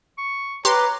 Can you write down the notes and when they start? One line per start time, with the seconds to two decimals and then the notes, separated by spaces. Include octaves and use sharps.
0.18 C#6
0.65 G4 B4 C#5 A#5 C6 D6 F#6